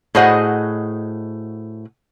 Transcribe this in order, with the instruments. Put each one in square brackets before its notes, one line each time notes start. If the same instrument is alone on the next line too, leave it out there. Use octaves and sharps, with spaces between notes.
[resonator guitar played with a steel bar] A2 F#4 G#4 C5 D#5 F#5